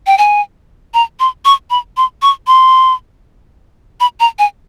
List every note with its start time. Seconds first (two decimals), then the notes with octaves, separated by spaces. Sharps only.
0.07 G5
0.18 G#5
0.94 A#5
1.20 C6
1.45 C#6
1.70 B5
1.97 C6
2.22 C#6
2.47 C6
4.00 B5
4.20 A#5
4.39 G#5